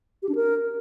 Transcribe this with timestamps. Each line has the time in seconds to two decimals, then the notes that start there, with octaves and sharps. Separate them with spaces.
0.23 G4
0.29 D4
0.35 A#4